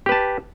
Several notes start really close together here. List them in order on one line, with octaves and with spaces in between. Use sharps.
G4 B4 A5